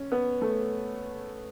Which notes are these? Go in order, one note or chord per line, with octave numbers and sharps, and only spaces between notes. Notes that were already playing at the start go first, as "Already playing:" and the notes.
Already playing: C#4
B3
A3